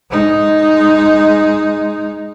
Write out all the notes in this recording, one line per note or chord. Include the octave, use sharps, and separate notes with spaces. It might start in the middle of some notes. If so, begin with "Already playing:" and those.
G#3 D#4